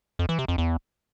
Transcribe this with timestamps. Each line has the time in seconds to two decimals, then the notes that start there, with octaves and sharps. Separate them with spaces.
0.19 F2
0.29 E3
0.39 C3
0.48 F2
0.58 E2